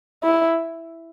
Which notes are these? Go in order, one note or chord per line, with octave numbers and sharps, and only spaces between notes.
E4